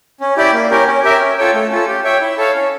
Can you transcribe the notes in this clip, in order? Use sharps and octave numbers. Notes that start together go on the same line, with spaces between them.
C#4
E4 G4 D5
A#3
C#4 G4 A#4
C#4
G4 A#4 E5
C#4
F4 A4 C#5 G5
A3
C#4 F4 A4
G4
C#5 E5 G5
E4
A4 C#5 F5
C#4